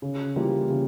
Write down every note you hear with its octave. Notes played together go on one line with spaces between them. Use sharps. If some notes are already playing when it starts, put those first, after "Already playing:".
C#3
E3 G3 A#3 F4
C#3